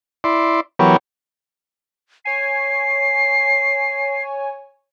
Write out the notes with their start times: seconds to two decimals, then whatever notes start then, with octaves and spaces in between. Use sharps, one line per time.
0.24 E4 D5 C6
0.79 E3 F#3 B3 G4 A#4 C#5
2.25 C#5 G#5 C7